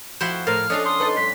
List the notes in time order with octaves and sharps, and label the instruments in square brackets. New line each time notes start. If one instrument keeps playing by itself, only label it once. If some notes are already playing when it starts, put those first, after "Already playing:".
[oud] F2 F#4 [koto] F3 E4 C5
[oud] A2 A#4 C5 [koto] F5 [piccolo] F6
[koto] C#4 D4 F5 [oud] A4 [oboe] D#5
[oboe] C6 [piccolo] D#6
[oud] D#4 A4 B4
[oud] G2 [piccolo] B6